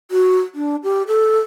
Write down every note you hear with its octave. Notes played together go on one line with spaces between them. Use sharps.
F#4
D4
G4
A4